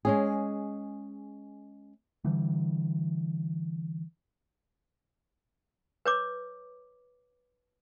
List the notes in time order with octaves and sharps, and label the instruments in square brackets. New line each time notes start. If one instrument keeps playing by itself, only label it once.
[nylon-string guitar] G#3 C#4 G#4
[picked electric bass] D3 E3 G3
[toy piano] B4 C#5 D6